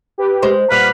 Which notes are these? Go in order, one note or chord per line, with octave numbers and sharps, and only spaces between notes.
G4 B4
G#3 C5
A#2 G3 B4 F#5 F6